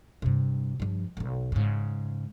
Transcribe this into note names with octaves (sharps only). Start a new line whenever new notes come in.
G2 C3
G2 F3
E1 B1
G#2 C#3